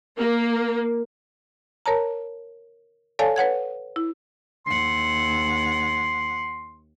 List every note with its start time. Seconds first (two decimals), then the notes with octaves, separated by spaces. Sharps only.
0.18 A#3
1.86 A#4 C#5 A5 A#5
3.19 A4 C#5 D5 F5 G#5 A5
3.36 B4 C#5 F#5 G#6
3.96 E4
4.66 D#2 F#5 C6